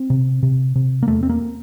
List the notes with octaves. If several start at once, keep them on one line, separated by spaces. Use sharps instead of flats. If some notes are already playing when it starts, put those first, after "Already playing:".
Already playing: C4
C3
C3
C3
A#3
E2 A3
C4
A#3